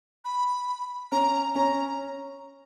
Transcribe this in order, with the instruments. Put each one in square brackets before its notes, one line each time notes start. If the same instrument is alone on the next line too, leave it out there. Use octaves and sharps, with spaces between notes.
[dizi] B5
[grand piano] C#4 [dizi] A#5
[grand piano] C#4 [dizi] A#5